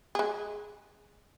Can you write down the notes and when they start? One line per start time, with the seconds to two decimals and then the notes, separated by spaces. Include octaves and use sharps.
0.15 G#3 G#4